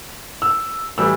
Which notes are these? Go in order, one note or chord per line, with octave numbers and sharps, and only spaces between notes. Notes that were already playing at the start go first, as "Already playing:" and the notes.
E6
A2 E3 G3 E6